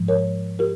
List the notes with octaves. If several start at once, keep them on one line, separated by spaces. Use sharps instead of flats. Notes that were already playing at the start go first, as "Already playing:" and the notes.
Already playing: G#2 F3 G#3
A#4 C#5
G4 A#4